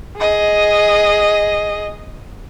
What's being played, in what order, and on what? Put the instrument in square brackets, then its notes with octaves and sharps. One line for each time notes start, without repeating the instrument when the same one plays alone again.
[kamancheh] G#4 D#5